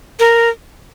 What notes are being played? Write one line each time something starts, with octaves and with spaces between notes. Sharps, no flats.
A#4